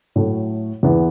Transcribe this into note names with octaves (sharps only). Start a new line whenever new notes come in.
A2 F#3 A3
E2 E3 B3